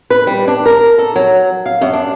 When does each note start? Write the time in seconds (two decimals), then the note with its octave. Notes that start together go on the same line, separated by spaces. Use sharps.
0.10 B4
0.27 G3
0.48 D4
0.66 A#4
0.98 A4
1.16 F#3
1.66 F5
1.81 F#2
1.93 D4